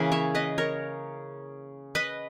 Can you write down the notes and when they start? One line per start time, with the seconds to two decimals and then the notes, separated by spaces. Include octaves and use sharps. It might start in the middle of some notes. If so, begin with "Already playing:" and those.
Already playing: C#3 E3 A#3 B4
0.12 C#5 E5
0.35 B4 D#5
0.58 A#4 C#5
1.95 B4 D#5